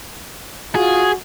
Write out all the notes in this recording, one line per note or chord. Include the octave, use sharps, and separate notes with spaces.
F4 F#4 G#4